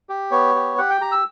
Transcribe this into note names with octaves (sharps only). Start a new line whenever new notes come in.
G4
B3 C#5
G4
G4 F#5
G5
G4 A#5
E6